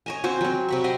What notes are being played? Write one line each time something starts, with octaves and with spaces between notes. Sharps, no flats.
C#5 D#5 G#5
C4 F#4 C5 C#5
F#3 C4
C3 B5 C#6
D#5 F#5 G5 C6